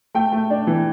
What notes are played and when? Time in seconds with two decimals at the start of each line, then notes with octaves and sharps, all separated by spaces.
0.15 A3 G5
0.32 A3
0.50 D4
0.67 E3